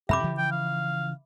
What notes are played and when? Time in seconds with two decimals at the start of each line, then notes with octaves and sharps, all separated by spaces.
0.09 F#2 C3 G4 E5 B5 D6
0.24 C#3 E3 F3
0.37 G5
0.51 F5